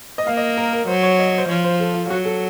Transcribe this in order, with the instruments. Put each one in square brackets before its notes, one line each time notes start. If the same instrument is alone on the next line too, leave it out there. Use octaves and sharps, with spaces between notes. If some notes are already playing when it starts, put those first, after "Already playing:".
[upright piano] D#5
[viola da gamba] A#3 [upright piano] F5
[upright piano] D#5
A#4
A#4
[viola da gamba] F#3 [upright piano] C5
[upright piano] C#5
D#5
C5
[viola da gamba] F3 [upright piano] C#5
[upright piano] C5
A4
F4
[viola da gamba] F#3 [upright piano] F#4
[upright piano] A4